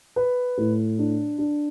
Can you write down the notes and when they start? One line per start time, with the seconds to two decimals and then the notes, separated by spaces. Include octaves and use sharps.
0.16 B4
0.58 A2
0.99 D4
1.38 D4